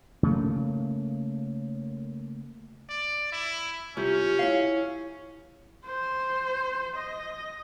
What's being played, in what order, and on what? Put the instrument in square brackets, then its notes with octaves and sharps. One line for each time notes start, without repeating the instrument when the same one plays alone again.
[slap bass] C#3 A3 A#3
[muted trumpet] D5
E4
[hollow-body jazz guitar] C2 [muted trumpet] C#4 [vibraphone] F4 G4
[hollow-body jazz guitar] E4 F5 [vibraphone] C#5
[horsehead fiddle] C5
D#5